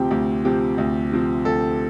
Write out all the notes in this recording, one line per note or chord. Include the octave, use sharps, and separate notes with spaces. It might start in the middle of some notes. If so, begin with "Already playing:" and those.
Already playing: D2 C3 F3 C4 G4 G5
D2 G4
C3 F3 C4 G4
D2
C3 F3 C4
D2 A4